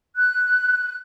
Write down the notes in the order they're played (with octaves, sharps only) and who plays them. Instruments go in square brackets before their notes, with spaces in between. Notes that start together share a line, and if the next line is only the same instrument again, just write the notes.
[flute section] F#6